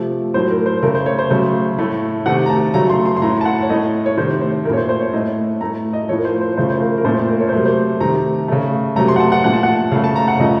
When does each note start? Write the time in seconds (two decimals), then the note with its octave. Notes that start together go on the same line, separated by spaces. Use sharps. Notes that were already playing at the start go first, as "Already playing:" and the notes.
Already playing: C3 F3 A3
0.34 A2 F#3 A3 C5
0.50 A#4
0.66 C5
0.83 C#3 A3 A#4
0.95 C5
1.06 C#5
1.19 C5
1.30 C#3 F#3 A3 C5
1.78 A2 A3
2.26 C3 D#3 A3 F#5
2.46 A#5
2.50 A5
2.74 C#3 F#3 A3 A#5
2.90 C6
3.06 C6
3.17 C6
3.22 A2 A3 A#5
3.41 A5
3.45 F#5
3.62 C#5
3.69 A2 A3 D#5
4.06 C#5
4.17 C3 D#3 A3 C5
4.41 C5
4.65 A3 A#4
4.70 A#2 C#5
4.77 C5
4.89 C5
5.01 C#5
5.13 A2 A3 D#5
5.61 A2 A3 A#5
5.93 D#5
6.09 A2 F3 A3 C#5
6.18 A#4
6.25 C5
6.41 C5
6.57 C#3 F3 A3 C5
6.70 C5
6.80 A#4
6.98 A#4
7.05 A#2 A3 C5
7.17 C5
7.29 A#4
7.41 C#5
7.49 C5
7.52 C3 F#3 A3 A#4
7.65 C5
8.00 C3 D#3 A3 A#5
8.48 C#3 A3
8.96 C3 F#3 A3 A#5
9.08 C6
9.16 F#5
9.20 A5
9.32 F#5
9.44 A#2 F3 A3 F#5
9.53 A5
9.63 F#5
9.92 C#3 F5
9.96 A3
10.04 A5
10.16 A#5
10.28 F#5
10.40 C#3 F3 A3 D#5